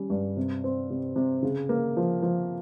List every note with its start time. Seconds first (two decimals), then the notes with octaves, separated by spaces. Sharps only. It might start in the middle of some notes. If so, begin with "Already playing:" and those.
Already playing: G3 C#4
0.10 G2
0.37 C3
0.64 C4
0.90 C3
1.16 C3
1.43 C#3
1.69 A#3
1.97 F3
2.22 F3